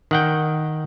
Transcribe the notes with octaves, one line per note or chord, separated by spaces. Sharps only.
D#3 F#5 G5